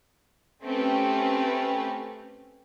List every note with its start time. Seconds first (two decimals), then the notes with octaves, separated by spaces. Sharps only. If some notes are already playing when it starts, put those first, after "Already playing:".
0.63 A3 C4 C#4 G4 B4